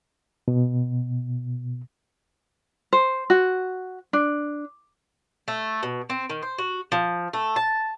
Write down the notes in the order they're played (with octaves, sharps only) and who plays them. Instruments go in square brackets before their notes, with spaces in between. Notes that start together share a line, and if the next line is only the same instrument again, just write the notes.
[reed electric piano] B2
[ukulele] C5
F#4
D4
[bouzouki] A3
B2
C4
D#3
C5
F#4
F3
A3
A5